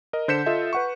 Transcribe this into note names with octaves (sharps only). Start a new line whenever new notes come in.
A#4 D#5
D3 C5 G6 B6 C#7 E7
F4 A4 D#5 E5
B4 F#5 C#6